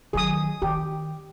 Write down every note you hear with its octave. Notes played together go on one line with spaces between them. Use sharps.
D#3 F#3 G#4 D#6
D#3 G4